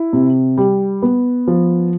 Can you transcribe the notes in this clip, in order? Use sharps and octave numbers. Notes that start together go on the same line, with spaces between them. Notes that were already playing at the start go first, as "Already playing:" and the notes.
Already playing: E4
C3
G3
B3
F3